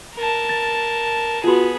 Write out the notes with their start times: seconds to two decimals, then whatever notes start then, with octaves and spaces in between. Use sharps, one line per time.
0.16 A#4 A5
0.49 A6
1.44 B3 F4 F#4 G#4